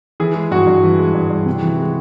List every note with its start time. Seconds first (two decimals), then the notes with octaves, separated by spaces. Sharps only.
0.20 E3 G#4
0.35 G#3
0.51 G2 F#4
0.67 G2
0.83 E3
0.99 G#3
1.14 G2
1.30 G2
1.46 C3
1.62 E3
1.79 G#3